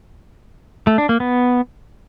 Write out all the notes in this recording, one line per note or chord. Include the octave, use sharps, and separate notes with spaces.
A3
D4
A#3
B3